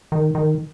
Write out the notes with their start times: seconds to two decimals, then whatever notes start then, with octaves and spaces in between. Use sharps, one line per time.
0.12 D#3
0.35 D#3